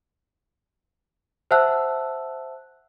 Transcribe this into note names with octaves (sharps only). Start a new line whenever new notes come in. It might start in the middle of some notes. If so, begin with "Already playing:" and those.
C5 E5 F#5 A5 E6 F#6